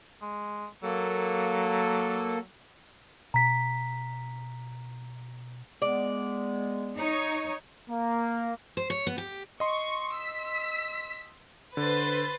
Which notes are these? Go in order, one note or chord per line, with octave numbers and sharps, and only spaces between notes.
G#3
F#3 A#3 A4
B2 A#5 B6
G#3 B3 D5
D#4 C#5
A#3
C5
C#5
B3
G4
D#5 C6 C#6
E6 B6
D3 B4 C5 A6